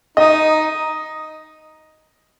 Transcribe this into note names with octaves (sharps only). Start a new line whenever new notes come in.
D#4 D#5